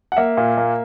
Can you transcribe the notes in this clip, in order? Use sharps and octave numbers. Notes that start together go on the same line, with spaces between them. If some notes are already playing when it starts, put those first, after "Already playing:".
F#5
A#3 E5
A#2
A#3